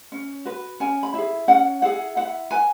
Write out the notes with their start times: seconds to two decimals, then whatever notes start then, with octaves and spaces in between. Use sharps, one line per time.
0.12 C#4
0.45 F#4 B4
0.80 C#4 G#5
1.03 B5
1.14 E4 G#4
1.48 C#4 F#5
1.82 E4 G#4 F#5
2.16 E4 F#5
2.51 B4 G#5